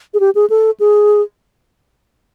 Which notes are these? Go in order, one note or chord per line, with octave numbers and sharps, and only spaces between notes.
G#4
G4
G#4
A4
G#4